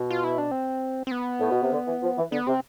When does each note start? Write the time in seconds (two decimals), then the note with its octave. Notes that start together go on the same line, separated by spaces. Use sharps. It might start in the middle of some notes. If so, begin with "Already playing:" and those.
Already playing: B2
0.10 F4
0.24 E4
0.38 D4
0.51 C4
1.07 C4
1.11 B3
1.40 A2
1.50 B2
1.62 C3
1.72 D3
1.87 E3
2.02 F3
2.17 E3
2.32 D3 B3
2.47 C3 C4